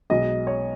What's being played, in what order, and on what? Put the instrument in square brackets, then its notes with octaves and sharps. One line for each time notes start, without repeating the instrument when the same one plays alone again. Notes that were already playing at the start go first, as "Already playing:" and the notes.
[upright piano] B1 B2 G#3 D#5
C#5